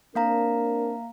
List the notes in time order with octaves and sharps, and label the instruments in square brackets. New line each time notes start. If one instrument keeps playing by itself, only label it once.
[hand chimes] A#3 F5 A#5 [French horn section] C4 D4 A#4